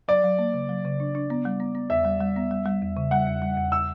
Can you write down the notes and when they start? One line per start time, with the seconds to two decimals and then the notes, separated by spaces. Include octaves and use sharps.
0.08 F#3 D5
0.24 F#3
0.39 A#3
0.54 C#3
0.69 F#3
0.85 C#3
1.00 D4
1.15 D4
1.30 B3
1.45 G3
1.60 B3
1.75 B3
1.90 E2 E5
2.05 G3
2.21 G3
2.36 B3
2.51 G3
2.66 G3
2.82 E2
2.97 C#3
3.11 G3 F#5
3.27 E2
3.42 G3
3.57 E2
3.72 E6